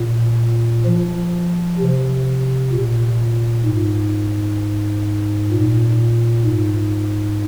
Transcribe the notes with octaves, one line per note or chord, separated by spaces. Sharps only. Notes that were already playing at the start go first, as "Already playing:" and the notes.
Already playing: A#2
F3
C3
A#2
G#2
A#2
G#2